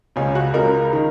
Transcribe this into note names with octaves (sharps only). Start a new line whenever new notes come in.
C#2 C#3 C#4
F#4
C#2 C#3 A#4
D#3